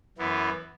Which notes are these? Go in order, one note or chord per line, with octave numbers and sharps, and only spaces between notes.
F#2 E3 B3